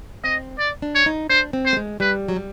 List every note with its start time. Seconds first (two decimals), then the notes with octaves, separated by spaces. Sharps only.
0.24 C4 D#5
0.59 D5
0.82 D4
0.95 C#5
1.06 D#4
1.30 D4 C5
1.53 C4
1.66 C5
1.73 A3
1.77 G#3
2.00 G3 B4
2.28 F#3
2.36 G3